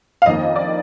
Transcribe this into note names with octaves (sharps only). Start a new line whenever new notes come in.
F5
F2 D#3 A#3 D#5
D5